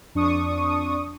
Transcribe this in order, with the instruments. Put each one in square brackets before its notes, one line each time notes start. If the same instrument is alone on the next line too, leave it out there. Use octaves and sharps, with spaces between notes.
[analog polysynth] F2 D4 C#6 D#6